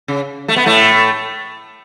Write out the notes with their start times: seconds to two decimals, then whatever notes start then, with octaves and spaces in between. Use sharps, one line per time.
0.08 C#3
0.48 A3
0.56 B3
0.66 A2 A3